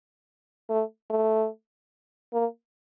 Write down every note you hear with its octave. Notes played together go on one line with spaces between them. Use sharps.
A3
A3
A#3